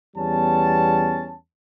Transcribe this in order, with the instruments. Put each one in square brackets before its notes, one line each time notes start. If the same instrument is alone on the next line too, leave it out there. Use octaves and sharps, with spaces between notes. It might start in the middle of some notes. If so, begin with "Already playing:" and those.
[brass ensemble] E2 G3 B3 C#4 A5